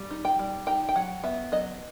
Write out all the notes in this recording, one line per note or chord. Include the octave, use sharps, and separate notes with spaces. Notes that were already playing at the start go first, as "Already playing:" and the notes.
Already playing: G3
D#4
G5
G3
D#4 G5
G5
F#3 F#5
B3 E5
F#3 D#5